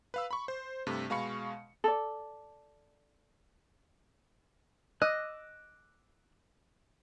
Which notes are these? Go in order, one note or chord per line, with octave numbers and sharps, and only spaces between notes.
B4 F5 E6
B5 C#6
C5
G2 C3 A3
B2 G#3 F5 B5 C#6 C#7
A4 D5
D#5 D6 E6 F#6